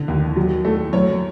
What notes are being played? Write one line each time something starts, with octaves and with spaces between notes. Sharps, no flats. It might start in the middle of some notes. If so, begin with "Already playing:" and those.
Already playing: D3
D#2
F#3
A3
F#2 C#5